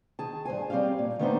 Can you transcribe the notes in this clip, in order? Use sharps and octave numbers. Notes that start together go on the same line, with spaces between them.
D#3 G#4 A5
G2 C#3 C5 G#5
G3 C4 C#4 G4 F5
A#2
D#3 A3 B3 D4 D#4 C5